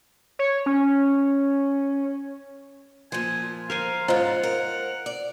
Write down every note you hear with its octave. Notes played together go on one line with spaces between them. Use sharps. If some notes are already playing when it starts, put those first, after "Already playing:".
C#5
C#4
A#2 F3 G#5
A#4 C5 F5 G#5
G#2 C#4 F4 C5 D#5 F#5 A#5
A#4
D5